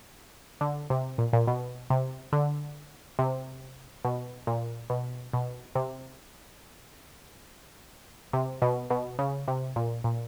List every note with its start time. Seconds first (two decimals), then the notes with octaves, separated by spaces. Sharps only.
0.61 D3
0.90 C3
1.18 A#2
1.33 A#2
1.47 B2
1.90 C3
2.33 D3
3.19 C3
4.05 B2
4.47 A#2
4.90 B2
5.33 B2
5.75 C3
8.33 C3
8.62 B2
8.90 B2
9.19 C#3
9.48 C3
9.76 A#2
10.04 A#2